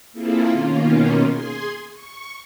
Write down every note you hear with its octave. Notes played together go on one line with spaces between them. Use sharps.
A#3 C4 E4 F4 G#4 A4
B2 D#3 A#3 C#4 F4
G#4 G#5 C6
C#6